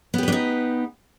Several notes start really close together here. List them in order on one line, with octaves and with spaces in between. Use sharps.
B3 G4 B4 D4 D#4